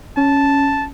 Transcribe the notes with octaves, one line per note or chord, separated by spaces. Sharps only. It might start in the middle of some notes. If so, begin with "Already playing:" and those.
C#4 A5